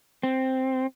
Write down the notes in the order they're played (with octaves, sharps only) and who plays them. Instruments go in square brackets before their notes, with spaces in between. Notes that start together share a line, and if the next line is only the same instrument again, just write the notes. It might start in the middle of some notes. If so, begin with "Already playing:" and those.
[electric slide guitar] C4